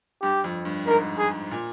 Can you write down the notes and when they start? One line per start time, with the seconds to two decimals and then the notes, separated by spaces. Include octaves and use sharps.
0.22 G2 G4
0.44 F2
0.65 G2
0.87 G#2 A#4
1.18 G#4
1.51 A#2